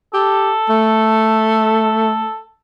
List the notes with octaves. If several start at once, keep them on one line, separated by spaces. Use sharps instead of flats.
G4 A4
A3